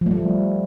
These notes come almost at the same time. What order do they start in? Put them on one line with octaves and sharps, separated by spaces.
F3 A3 G3